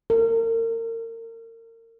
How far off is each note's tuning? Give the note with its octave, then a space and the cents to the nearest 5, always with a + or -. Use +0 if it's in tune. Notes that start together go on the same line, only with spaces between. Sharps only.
A#4 -35